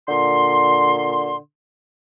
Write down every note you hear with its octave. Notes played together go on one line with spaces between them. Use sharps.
A#2 D3 C6